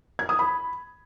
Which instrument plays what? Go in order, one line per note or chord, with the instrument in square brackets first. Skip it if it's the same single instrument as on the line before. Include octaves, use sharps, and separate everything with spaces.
[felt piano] G#6
D#6
B5